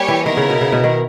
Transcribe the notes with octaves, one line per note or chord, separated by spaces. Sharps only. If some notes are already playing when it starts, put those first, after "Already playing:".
Already playing: G3 A#3 G4 C#5 G#5
E3
D#3 B3 E4 A#4
C#3
B2
C#3
B2
D#3